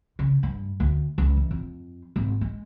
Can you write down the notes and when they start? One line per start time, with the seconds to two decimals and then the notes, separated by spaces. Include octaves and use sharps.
0.19 C#3
0.43 G2
0.80 D2
1.18 C#2
1.37 E3
1.51 F2
2.16 G#1
2.41 G#3